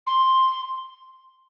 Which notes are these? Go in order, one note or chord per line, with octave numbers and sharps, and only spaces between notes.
C6